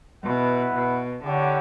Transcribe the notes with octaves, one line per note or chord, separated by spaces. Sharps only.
B2 B3 E4 B4 F#5
B2
D3 E4 G4 C#5 F#5